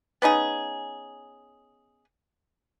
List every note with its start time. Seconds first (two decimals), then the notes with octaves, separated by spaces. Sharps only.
0.22 B3 C#4 D#4 G#4